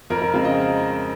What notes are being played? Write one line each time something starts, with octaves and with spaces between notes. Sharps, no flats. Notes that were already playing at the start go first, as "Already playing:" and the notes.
F2 A#4
A#4
C#3 G#3 C4 F4
D#5